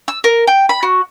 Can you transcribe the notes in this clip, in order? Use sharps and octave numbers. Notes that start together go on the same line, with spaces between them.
E6
A#4
G5
B5
F#4